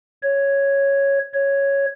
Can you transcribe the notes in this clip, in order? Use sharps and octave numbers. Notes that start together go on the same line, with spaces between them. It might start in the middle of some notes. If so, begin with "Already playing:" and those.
C#5
C#5